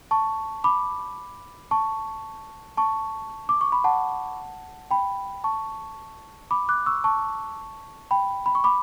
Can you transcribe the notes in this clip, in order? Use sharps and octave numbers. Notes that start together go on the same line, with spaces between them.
A5 C#6
B5 D6
A5 C#6
A5 C#6
D6
C#6
B5
F#5 A5
G5 B5
A5 C#6
B5 D6
D6 F#6
C#6 E6
A5 C#6
G5 B5
B5
C#6
B5 D6